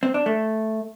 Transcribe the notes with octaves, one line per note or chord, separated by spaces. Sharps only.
C4
D4
A3